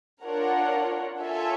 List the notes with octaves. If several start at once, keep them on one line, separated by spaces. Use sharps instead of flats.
D4 F4 A#4 C#5 F#5
F4 A4 C#5 E5 G#5